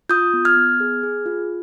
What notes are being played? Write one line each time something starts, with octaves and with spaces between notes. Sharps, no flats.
F4 D#6 G6
B3
F6 G#6
B3
G#4
G#4
F4